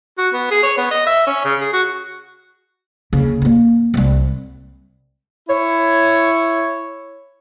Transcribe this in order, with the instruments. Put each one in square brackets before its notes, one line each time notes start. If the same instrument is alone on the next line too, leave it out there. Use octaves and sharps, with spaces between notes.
[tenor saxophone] F#4
B3
G#4
C#5
B3
D#5
E5
C#4
C#3
G#4
F#4
[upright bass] D#2 C#3
A#3 C#4
C2 G3
[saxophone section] E4 C#5